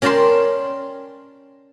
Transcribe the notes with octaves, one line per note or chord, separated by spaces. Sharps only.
C#4 A#4 D5 G5 A5 C6